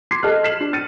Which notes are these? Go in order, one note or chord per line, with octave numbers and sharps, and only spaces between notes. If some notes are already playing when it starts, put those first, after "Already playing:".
C6 D6 G#6 C7
A4 D#5 A5 F6 F#6
F6 B6 C7 E7 F#7
D4
F6 A6 C#7 D#7